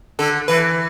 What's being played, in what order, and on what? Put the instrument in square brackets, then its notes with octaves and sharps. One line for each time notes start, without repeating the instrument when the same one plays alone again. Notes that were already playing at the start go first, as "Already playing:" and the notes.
[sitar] D3 [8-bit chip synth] A4
[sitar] E3 [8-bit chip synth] B4